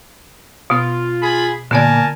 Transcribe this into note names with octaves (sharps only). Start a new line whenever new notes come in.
B2 B3 F4
G#4 B5
A#2 D3 B3 A#4 D5 G#5 A5